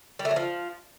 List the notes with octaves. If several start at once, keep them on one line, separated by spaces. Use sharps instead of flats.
G3
A3
F#3
F3